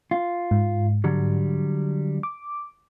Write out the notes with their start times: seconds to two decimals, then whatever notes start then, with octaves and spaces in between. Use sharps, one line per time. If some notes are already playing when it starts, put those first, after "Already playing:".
0.11 F4
0.51 G#2
1.04 D3 F#3 G3
2.23 D6